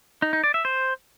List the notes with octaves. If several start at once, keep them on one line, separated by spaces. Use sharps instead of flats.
D#4
D#4
D5
E5
C5